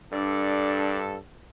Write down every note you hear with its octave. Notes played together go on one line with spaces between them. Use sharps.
G2 D4 A4 D5